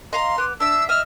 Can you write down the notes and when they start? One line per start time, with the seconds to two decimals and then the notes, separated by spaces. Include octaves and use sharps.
0.13 D#5 F5 A#5 C6
0.38 B3 D6
0.60 D4 E5 E6
0.89 D#5 E5 E6 F6